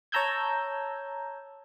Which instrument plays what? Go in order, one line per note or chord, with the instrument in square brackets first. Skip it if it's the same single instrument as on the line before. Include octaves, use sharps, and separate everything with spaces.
[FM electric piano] C#5 A5 A#5 E6 G6 G#6